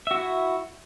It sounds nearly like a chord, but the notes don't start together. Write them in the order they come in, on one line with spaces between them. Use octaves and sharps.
E5 F#4 E4